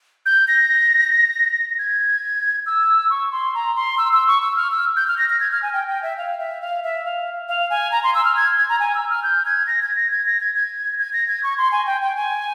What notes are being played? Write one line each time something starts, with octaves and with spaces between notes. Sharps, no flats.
G6
A#6
G#6
E6
C#6
C6
A#5
C6
E6
E6
C#6
E6
F6
E6
G6
F6
A#6
A#6
G#6
F6
G#5
G5
G5
E5
F5
E5
F5
E5
F5
F5
G#5
A#5
C6
E6
F6
G#6
G#6
A#5
G#5
E6
F6
G6
G#6
A#6
G#6
A#6
G#6
A#6
G#6
G#6
G#6
A#6
G#6
C#6
C6
G#5
G5
G5
G#5